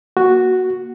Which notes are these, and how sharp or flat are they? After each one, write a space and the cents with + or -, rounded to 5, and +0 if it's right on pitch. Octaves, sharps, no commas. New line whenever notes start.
A#3 +25 F#4 +0